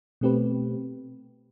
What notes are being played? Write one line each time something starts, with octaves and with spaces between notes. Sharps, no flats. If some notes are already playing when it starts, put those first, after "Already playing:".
B2 A3 C4 G4 B4